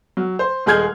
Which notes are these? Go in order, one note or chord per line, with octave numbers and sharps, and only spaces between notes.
F#3
C5
D#1 G#3 G#4 F6 G6 G#6